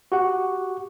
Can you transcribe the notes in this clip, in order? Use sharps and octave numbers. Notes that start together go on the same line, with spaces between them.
F#4 G4 F#5